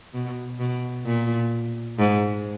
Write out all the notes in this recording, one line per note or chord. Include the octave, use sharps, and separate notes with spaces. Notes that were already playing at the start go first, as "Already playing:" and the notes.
B2
B2
A#2
G#2